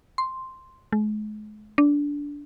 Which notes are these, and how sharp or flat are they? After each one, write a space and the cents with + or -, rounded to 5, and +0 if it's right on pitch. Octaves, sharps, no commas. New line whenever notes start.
C6 +0
G#3 +40
D4 -15